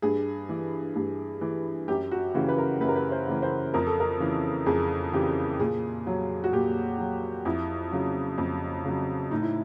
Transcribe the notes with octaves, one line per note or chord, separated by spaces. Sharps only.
G2 G#4
E3
G2
E3
F#2 G4
F#4
C#3 E3 F#4
B4
A#4
F#2 B4
A#4
B4
C5
C#3 E3
C5
F2 A#4
A4
A#4
C#3 E3
F2 G#4
C#3 E3 G4
A#2 G#4
F#3
F#4
A#2 G4
F#3
F2 E4
C#3 F#3
F2
C#3 F#3
A2 D#4
E4